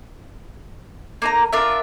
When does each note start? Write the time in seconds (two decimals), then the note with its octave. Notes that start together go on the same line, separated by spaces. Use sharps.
1.22 A#3 D#4 A#5
1.52 D4 F4 A#4 E5